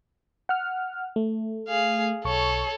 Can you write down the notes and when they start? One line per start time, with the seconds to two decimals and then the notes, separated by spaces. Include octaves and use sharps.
0.49 F#5 F6
1.16 A3
1.69 G#4 F5
2.25 B1 A4 C#5 C#6